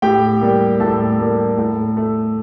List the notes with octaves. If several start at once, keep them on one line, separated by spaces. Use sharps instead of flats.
A2 G4 G5
G3 A#3
A2 A4 A5
G3 A#3
A2
A3